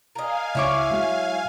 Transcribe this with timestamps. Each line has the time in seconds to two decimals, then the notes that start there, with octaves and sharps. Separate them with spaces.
0.15 A#4 D#5 F5 G#5
0.55 C#2 F#3 E4 C#5 E5 D6
0.91 F#3 G#3